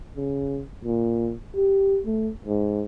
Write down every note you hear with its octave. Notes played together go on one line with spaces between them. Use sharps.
C#3
A#2
G4
A3
G#2